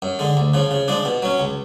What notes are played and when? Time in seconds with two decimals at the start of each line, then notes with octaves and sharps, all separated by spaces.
0.02 F#2
0.19 D3 G#3
0.37 D2
0.54 C#3 F3
0.71 C#3
0.88 F3 G#3 D4
1.05 B2
1.22 F#3 C#4
1.40 C#2